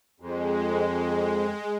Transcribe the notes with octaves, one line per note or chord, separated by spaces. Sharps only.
F2 G#3